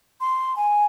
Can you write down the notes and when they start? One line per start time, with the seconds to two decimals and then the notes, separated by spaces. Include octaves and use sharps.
0.21 C6
0.56 G#5